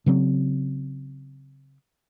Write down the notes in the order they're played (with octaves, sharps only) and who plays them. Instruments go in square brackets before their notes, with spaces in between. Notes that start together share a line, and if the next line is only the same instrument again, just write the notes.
[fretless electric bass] C#3 F#3 C4